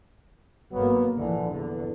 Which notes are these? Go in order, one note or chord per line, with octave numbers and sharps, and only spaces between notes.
G#1 F#3 A#3 B3
A#1 D3 E3
E2 D3